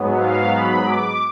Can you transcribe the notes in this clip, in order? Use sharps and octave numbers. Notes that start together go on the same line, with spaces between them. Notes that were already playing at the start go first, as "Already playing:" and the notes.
Already playing: G#2 F#3 B3
F5
B5
D6